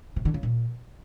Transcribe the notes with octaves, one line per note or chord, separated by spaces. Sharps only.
C3
D3
C#3
A#2